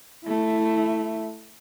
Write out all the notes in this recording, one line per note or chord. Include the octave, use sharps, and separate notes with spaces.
A3 E4